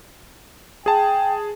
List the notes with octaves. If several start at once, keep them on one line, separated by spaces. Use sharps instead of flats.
G#4 G5 A5